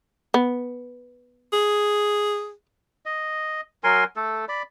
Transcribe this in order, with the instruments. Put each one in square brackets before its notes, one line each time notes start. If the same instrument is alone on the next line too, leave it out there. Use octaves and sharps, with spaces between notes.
[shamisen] B3
[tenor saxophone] G#4
[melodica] D#5
F#3 A#4 G#5 C6
A3 A4
D5 B5